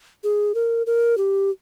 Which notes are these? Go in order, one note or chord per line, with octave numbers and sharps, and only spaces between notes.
G#4
A#4
A#4
G4